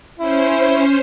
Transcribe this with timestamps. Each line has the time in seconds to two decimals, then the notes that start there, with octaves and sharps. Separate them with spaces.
0.19 C#4 E4 C5